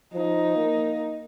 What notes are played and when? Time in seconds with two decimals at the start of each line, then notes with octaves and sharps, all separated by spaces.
0.14 F3 D#4
0.56 A#3